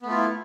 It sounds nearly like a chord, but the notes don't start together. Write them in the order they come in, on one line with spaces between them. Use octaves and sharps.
B3 A3 F4 E4